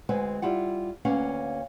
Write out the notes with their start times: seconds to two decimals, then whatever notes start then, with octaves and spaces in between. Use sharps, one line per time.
0.09 D2 G#3 C4 B4 F#5 G#5
0.42 G3 E4 F4 F#5
1.05 D2 A#3 C#4 B4 F5 F#5